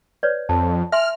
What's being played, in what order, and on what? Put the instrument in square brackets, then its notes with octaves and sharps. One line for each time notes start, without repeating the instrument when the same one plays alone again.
[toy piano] B4 C#5 D5
[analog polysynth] F2 [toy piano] A5
[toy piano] E5 G#5 C6 [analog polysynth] F6